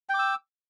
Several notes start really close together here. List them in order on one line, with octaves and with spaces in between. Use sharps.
G5 D6 E6